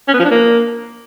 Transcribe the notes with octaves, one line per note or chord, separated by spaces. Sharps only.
C#4
B3
F3
D4
A#3